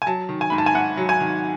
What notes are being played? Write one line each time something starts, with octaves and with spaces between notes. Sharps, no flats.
G#5
F#3 A5
D#3
G#5
G#2 B5
A5
G#5
G#2 F#5
F#3
G#5
D#3